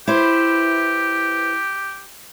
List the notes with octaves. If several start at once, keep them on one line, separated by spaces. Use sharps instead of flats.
E4 G4 B4 C5